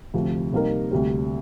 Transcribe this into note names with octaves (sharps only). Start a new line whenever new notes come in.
D2 C3 F3
C3 G3 A#3 D#4 A#4
D2 C3 G3